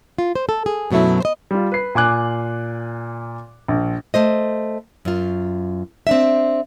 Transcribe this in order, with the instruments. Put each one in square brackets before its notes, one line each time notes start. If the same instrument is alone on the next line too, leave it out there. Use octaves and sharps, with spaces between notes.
[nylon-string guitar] F4
C5
A4
G#4
F#2 B2 F#3 A3 E4
C5 D#5
[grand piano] G3 F4
B4 C7
A#2 G#5 D6 F#6
A#1
[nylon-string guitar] A3 C5 D#5
F#2 F4
C4 D4 E5